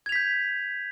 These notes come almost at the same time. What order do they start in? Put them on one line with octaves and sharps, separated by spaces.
G#6 F7 B6 G6